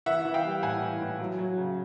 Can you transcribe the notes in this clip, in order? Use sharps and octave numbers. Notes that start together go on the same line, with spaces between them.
E3 E5 F#5
E3
F5 G5
G3
A2 F#5 G#5
E3
A2
F#3
F#3
C#3